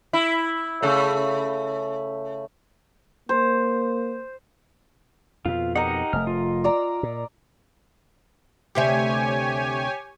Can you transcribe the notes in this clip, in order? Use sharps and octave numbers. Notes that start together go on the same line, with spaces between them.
E4
C#3 A3
A#3 C5
F2 B2 F4
D#4 G4 A#4 D#5 F#5
F1 A3 F6
F4
D5 A#5 E6
A#2
D2 C3 G4 C#5 E5 G#5